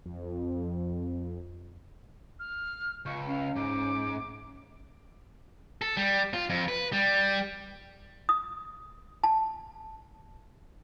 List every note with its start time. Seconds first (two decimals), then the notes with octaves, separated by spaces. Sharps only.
0.06 F2
2.39 F6
3.05 C#2 C#6
3.27 C#4 F5
3.56 G#2 D6
5.82 A4
5.97 G3
6.34 F4
6.50 F2
6.68 B4
6.92 G3
8.29 D#6
9.24 A5